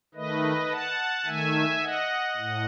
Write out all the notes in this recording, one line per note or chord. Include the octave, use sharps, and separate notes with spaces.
D#3 A3 B4 D#5
F#5 A5
D#3 A3 E5 G#5
D#5 F#5
A2